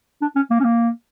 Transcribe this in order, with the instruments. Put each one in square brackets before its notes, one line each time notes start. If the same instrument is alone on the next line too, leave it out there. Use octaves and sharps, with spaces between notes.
[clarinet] D4
C#4
A#3
C#4
A#3